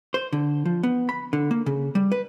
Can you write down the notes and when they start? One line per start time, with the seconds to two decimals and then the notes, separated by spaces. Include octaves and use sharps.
0.14 C5
0.33 D3
0.65 F3
0.83 B3
1.09 B5
1.33 D3
1.51 A#3
1.66 C#3
1.95 G3
2.12 B4